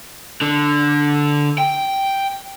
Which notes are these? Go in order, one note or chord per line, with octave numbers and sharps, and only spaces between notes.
D3
G5